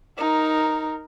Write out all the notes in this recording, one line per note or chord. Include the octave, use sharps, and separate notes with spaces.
D#4 A#4